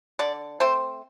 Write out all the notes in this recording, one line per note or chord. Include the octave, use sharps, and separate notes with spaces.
D3 D5
A3 C4 C5